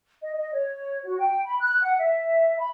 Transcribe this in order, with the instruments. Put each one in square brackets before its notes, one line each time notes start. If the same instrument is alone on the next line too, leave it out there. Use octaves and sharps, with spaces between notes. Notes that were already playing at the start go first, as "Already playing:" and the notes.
[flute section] D#5
D#5
C#5
F#4
G5
B5
F#6
F#5
E5
B5